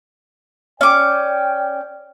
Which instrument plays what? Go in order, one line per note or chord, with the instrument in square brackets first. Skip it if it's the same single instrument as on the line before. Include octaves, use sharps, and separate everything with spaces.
[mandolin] C#4 D6 [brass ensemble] D5 G5